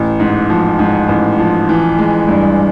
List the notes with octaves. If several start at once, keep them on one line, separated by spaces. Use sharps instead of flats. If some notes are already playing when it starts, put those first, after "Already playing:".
Already playing: A1
G#2
F3
G#2
A1
F3
E3
G#3
G2